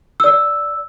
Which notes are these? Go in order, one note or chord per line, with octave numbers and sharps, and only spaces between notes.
D5 E6